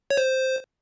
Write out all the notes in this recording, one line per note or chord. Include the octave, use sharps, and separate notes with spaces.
C#5
C5